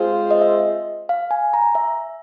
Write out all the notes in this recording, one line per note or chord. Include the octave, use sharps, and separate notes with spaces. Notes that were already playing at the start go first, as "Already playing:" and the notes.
Already playing: G#3 C4 F4 G#4 C5
D#5
E5
F5
G#5
A#5
E5